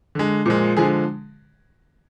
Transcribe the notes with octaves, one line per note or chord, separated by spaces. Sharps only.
D3 G#3
A#2 F3 G#3
D3 F3 G#3 G#4